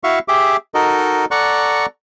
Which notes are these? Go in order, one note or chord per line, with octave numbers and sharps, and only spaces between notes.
E4 F#4 E5 F5 C#6
G4 G#4 E5 D6
D#4 F#4 A4 A#4 D#5
A4 D5 F#5 A#5 C#6 F#6